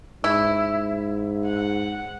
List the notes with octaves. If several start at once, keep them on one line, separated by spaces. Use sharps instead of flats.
G#2 E4
F#5